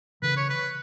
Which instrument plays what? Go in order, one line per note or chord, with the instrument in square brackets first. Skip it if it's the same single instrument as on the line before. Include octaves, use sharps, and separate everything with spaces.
[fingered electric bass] C#3 E3 [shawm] B4
[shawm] C#5
B4